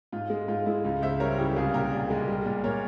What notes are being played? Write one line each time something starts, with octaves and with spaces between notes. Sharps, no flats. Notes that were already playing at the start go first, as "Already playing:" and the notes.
G#2 F4
G#3
G#2 F4
G#3 E4
C#2 F4
C#2 C5 E5
G3 A#4 C#5
C#3 E4 G4
C2 F4 G#4
A#2 G4 A#4
C2
G#3
G3
A#2
A#2 A#4 C#5